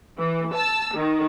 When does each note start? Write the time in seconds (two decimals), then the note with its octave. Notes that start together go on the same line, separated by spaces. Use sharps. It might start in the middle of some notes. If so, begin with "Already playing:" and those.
0.18 E3
0.54 A5 E6
0.95 D#3